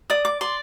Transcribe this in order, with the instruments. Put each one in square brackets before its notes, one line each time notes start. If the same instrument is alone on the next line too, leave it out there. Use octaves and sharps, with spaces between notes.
[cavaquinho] D5 D#6
D6
D5 C6